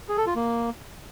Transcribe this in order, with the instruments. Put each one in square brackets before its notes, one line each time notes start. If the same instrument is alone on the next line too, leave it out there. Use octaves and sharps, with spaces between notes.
[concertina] G#4
A4
F4
A#3